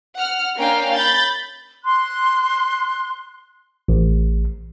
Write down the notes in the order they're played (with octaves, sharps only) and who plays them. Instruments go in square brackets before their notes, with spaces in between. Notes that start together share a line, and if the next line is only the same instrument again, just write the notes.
[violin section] F#5 F6
A#3 C#4 D4 F5 G5
B5 G6 A6
[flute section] C6 F#6
[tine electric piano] A1